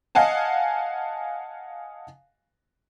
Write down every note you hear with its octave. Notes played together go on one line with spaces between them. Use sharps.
D#5 F5 F#5 G#5 A5